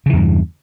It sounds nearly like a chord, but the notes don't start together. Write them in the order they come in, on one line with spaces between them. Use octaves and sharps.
C#3 E3 E2 G2